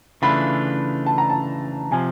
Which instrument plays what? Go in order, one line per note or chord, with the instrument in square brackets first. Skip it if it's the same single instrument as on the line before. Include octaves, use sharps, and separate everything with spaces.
[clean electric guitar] C#3 E3 A3 D4 F4 [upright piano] B5
[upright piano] A5
A#5
A5
[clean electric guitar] C3 F3 [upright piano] G#5